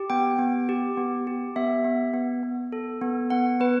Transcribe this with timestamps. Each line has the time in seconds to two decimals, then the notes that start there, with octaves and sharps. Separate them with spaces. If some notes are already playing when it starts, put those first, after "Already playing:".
Already playing: G4
0.10 B3 G5
0.39 B3
0.69 G4
0.97 B3
1.27 G4
1.56 B3 E5
1.84 B3
2.14 B3
2.43 B3
2.72 A4
3.01 B3
3.30 B3 F#5
3.60 B3 B4